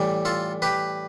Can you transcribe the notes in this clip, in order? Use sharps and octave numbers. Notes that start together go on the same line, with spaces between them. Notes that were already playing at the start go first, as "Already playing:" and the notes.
Already playing: A2 E3 G3
F4 A4
G4 B4